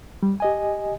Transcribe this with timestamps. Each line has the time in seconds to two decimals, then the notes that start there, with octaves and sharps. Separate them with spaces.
0.23 G3
0.40 G4 D#5 G#5